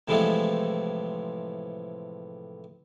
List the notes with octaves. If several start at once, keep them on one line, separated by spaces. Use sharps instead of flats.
A2 C3 E3 F3 G#3 A3